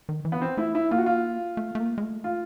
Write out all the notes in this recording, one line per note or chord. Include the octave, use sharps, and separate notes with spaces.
D#3
E3
B3
C4
A3 E4
E4
A#3 F4
F#4
F4
A3
A3
A#3
G#3
A3
F4